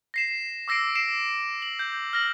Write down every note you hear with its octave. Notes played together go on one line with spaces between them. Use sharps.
A#6 C7 E7
D6 E6 A#6 C7 D7
C7 D7 E7
F#7
G6
F6 A#6 F#7